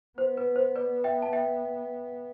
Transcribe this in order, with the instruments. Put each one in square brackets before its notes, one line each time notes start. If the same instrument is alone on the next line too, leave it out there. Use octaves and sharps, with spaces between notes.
[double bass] B3 [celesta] C5
[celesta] B4
C5
B4 D5
E5 G5
A5
E5 G5